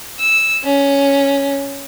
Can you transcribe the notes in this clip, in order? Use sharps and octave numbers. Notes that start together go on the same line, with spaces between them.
E6
C#4